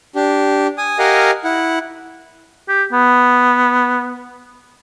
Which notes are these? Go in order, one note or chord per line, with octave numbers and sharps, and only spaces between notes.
D4 G4
G#5 D#6
G4 A#4 D#5 F5 F#5 G#5
E4 F#5
G4
B3